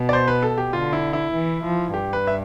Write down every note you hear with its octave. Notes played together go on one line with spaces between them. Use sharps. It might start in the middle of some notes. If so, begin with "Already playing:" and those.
Already playing: B2
D5
C5
B4
A4
G4
D3 F4
E4
E4
E3
F3
G2 G4
B4
E5